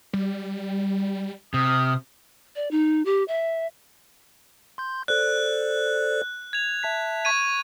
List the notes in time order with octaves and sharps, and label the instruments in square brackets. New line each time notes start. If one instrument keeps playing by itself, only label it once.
[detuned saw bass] G3
[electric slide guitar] C3 [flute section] D#6 F6
[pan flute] D5
D#4
G4
E5
[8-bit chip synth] C6 G6
[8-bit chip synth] A4 C5 D5 [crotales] F#6
[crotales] G#6 F7
[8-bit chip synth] E5 A5 B6
[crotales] C#6 G#6 D#7